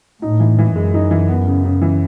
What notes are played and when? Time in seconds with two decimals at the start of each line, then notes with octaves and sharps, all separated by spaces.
0.22 A2 D#4
0.40 E3
0.58 E3
0.75 F#2 G#3
0.94 D#4
1.11 E3
1.28 B3
1.47 C#3
1.64 C#3
1.81 E3